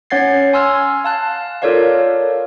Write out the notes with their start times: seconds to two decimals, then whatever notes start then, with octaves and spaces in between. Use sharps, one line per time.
0.10 C#4 C#5 F#5 G#6 A6 C7
0.53 G#5 C6 E6 F6 G#6
1.04 F5 A5 F#6
1.62 F4 A4 A#4 C#5 D5 F5